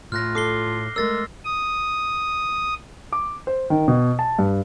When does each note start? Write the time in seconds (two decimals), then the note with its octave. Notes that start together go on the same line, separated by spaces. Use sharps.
0.12 A2 F4 F6 F#6 A#6
0.35 A4 D6 C7 G7
0.96 G#3 A3 A#4 E6 A6 A#6
1.45 D#6
3.12 D6
3.47 C5
3.70 D#3
3.88 B2
4.19 A5
4.39 G2